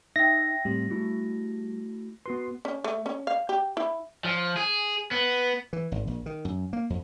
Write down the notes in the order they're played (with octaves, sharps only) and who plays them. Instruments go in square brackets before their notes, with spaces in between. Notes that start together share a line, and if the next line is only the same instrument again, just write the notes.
[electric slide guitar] D#4 [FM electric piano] E5 G5 [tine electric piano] A#6
[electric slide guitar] A2 C4 [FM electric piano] G3
[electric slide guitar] A3 E4 F#4
[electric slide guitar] B3 F#4 B4 [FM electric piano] C6
[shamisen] C#4
A3
C#4
F5
G4
E4
[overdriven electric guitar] F3
G#4
B3
[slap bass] E3
G#1
A#1
D#3
F#2
A#3
F2